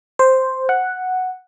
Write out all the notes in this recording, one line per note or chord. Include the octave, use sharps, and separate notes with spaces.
C5
F#5